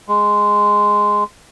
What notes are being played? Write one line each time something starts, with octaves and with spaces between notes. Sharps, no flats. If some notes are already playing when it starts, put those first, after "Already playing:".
G#3